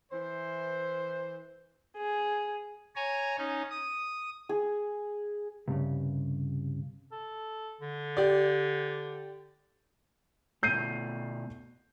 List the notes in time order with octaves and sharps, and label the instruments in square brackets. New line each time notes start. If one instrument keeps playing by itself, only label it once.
[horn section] E3 C5
[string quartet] G#4
[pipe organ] C#5 G#5 A#5
C#4 D#4
D#6
[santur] G#4
[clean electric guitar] C2 G2 A#2 C#3
[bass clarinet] A4
D3
[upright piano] G4 D5
[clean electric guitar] B2 A3 [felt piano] G6 C7 D#7